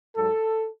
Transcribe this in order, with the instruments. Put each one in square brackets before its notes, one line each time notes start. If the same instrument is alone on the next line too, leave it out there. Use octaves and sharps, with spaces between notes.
[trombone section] G#2 F#3 A4